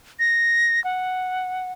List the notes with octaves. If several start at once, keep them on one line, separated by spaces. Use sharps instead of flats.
A#6
F#5